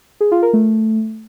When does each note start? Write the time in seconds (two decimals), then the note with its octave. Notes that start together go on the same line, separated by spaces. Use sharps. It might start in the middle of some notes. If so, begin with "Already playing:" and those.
0.21 G#4
0.31 F4
0.42 A#4
0.53 A3